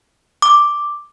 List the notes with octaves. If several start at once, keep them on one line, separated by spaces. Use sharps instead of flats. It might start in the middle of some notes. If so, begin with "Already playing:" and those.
D6